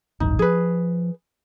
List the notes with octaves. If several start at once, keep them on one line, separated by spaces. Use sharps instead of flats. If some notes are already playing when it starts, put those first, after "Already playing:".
D1 A1 G2 D#4
F3 G#4 B4